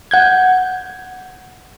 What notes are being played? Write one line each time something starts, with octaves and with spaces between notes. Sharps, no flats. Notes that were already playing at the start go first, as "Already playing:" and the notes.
F#5 G6 G#6